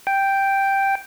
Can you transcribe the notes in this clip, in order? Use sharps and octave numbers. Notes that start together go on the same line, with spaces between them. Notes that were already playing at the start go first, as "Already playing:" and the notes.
G5